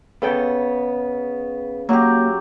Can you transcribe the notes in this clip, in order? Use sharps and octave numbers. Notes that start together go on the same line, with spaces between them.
C#3 B3 A4 G5
F#3 A#3 G4